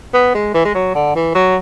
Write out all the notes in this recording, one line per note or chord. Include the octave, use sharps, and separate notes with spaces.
B3
G#3
E3
G#3
F#3
D3
E3
F#3